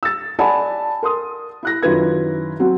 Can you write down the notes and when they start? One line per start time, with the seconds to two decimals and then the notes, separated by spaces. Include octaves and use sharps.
0.03 E6 A6
0.39 D5 F#5 G#5 A5 B5
1.03 A#4 C6 D#6
1.63 E4 F#6 A#6
1.83 F#2 D#3 E4 F4 B4 G#6
2.60 F#3 C4 F#4